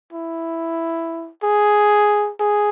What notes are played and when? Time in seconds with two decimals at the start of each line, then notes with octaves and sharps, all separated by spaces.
0.13 E4
1.43 G#4
2.40 G#4